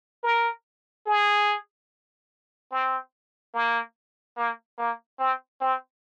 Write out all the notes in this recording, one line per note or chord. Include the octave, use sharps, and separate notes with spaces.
A#4
G#4
C4
A#3
A#3
A#3
C4
C4